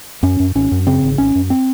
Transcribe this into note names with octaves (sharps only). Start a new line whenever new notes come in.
F#2 C#4
F#2
G#1 C#4
F#2
C#3 C4
G#1
G#1 C#4
F#2
C4